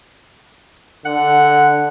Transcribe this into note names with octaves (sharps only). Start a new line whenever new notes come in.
D3 F#5